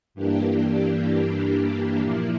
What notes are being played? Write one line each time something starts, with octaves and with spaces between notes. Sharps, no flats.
G2 E3 A#3 D4 G4
A#2 F3 A#3 E4